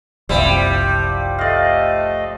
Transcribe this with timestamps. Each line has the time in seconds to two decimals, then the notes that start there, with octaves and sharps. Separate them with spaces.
0.29 F#1 C2 F3 G3 E4
1.38 A3 D5 D#5 F5